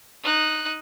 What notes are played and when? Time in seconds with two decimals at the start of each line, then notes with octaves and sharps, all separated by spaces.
0.23 D#4 F#6